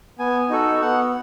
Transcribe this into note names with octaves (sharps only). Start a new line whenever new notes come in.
B3 G#5
D#4 F#4 A4
B3 F#5